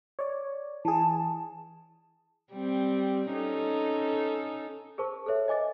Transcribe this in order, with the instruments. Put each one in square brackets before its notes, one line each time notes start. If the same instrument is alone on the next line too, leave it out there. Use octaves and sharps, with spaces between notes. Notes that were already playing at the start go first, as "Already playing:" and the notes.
[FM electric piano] C#5 D5
[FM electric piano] E3 G#4 [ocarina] A5
[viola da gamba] G3 C4
C#4 D#4 A4
[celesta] G#4 A#4 C5 A5 C#6
A4 B4 C#5 E5
D#5 G#5 D6 A6